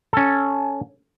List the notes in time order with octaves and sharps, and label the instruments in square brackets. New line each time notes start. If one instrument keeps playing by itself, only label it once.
[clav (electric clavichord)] C#4 A4